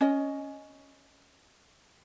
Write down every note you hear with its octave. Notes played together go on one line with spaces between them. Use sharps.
C#4 D#5